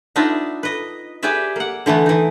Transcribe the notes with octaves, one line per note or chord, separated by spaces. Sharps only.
B3 D4 D#4 F4 D#5 E5
B4 D#5
G4 G#4 B4 D5 E5
A#3 F#5
D3 E3 A3 B3
E3 D#4